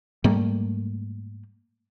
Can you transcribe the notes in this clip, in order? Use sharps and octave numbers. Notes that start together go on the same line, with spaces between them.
G#2 G3 A3 A#3